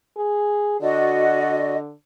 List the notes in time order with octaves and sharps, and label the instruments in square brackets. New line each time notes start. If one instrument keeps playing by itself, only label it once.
[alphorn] G#4
[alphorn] D3 [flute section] F#4 D5 D#5